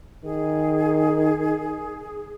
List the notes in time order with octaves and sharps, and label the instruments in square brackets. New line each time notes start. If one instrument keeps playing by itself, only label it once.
[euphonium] D#3 [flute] G#4